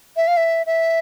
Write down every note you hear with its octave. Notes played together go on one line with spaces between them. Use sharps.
E5
F5
E5
E5